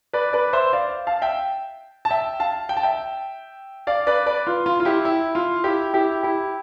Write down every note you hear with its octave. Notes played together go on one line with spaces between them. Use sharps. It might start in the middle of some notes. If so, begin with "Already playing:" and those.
B4 D5
B4 D5
C5 E5
D5 F5
F5 A5
E5 G5
A5
E5 G5
F5 A5
G5
A5
E5 G5
D5 F5
B4 D5
B4 D5
F4
F4
F4
E4 G4
E4
F4
E4 G4
E4 G4
E4 G4